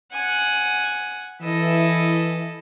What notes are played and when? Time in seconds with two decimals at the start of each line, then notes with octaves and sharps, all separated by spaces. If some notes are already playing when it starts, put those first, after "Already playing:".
0.14 F#5 G#5
1.42 E3 E4 A4 D#5